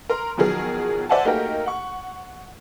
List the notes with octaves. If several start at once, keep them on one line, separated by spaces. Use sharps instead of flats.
A#4 A#5 C6
B2 D#3 F3 F#3 G#4 A#4
C5 D5 E5 F#5 G#5 A5
A3 A#3 D#4 F#4 G4 A#4
F#5 C#6